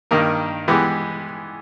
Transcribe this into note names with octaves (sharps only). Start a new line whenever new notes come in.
G2 D#3 A#3 D#4 A#4
E3 G#3 B3 G4